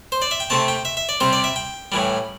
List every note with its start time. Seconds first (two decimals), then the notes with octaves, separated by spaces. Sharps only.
0.12 C5
0.22 D5
0.31 E5
0.40 G5
0.50 C3 A3 C4 A5
0.68 G5
0.85 E5
0.97 E5
1.09 D5
1.20 C3 G3 C4 C5
1.33 D5
1.44 E5
1.56 G5
1.92 A2 E3 G3